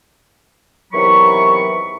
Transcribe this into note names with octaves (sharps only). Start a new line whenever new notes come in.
E2 C3 D#3 F#3 B5 C#6